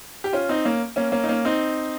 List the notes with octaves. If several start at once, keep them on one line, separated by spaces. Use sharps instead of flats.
G4
C#4 F4
C4 D#4
A#3 C#4
A#3 C#4
A#3 C#4
D#4
A#3 C#4
C4 D#4